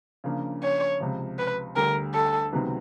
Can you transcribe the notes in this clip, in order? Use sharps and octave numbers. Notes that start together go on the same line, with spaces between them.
C#3 F3 A#3 D4
C#5
C#2 C3 F3
B4
D2 D3 G3 A#4
A4
C#2 C3 D#3 F#3 B3